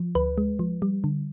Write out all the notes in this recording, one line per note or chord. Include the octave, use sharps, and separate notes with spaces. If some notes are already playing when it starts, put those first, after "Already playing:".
Already playing: F3
D2 B4
G#3
F3
G3
D3